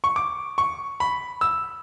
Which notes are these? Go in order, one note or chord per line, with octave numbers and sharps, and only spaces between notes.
C#6
D6
C#6
B5
E6